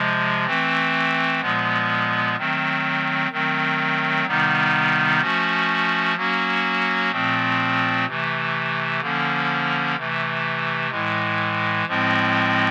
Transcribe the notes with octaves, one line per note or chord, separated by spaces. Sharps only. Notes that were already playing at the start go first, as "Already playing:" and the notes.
Already playing: C3 F3 G#3
E3 A3 C4
A#2 F3 G#3 B3
D#3 F#3 A3 C4
D#3 F#3 A3 C4
C3 D#3 G3 B3 D#4
F3 A3 C#4 F#4
F#3 A#3 C#4 F#4
A#2 F3 A3 C4
C3 E3 A3
D3 F3 A#3 C#4
C3 E3 A3
A2 E3 G#3
A2 F3 G#3 C4